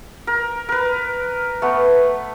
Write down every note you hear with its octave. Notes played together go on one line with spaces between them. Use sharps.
A#4
A#4 B4
A3 B3